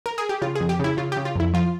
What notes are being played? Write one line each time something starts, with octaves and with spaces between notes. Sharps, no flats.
A#4
G#4
G4
C#3 F4
G#4
F2
G4
C#3 E4
C#3 F4
G4
C#3
F4
F2 E4
F3 F4